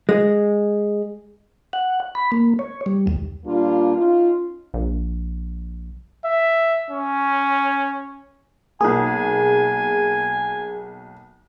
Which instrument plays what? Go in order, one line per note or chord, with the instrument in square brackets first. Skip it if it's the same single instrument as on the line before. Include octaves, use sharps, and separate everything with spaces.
[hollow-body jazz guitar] G#3
[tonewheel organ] F#5
B5
A#3
C#5
G3
D#2
[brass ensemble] A#2 G3 A#3 D4 F4
C#4 D#4 F4
[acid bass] A#1
[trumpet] E5
C#4
[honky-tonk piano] B1 A#3 [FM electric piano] G#4 [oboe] G#5